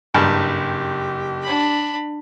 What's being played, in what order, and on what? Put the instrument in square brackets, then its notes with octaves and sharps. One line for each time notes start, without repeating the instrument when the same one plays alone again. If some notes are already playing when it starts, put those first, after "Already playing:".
[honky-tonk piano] F#1 [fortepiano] G2 [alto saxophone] G4
[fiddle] D4 B5